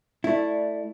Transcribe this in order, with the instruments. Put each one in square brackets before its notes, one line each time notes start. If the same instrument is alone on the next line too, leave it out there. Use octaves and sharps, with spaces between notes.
[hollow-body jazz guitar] A3 E4 [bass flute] D5